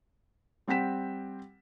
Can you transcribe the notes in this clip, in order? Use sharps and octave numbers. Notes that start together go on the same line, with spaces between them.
G3 C4 F#5 G5 B6 E7